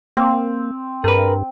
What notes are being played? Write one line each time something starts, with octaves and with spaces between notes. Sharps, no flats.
A#3 C4
G2 G#4 A#4 B4